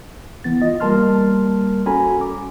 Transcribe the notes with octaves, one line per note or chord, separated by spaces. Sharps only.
E3 B3 A6
F4 D#5
G3 A#3 A#4 A5 C6 F6
C#4 F#4 A4 G#5 A#5 B5
D6